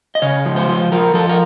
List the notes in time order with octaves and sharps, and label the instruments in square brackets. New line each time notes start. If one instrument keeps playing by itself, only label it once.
[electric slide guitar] D#5
C#3 C#5
F3
C5
F3
F3 A#4
F3 A4
A#4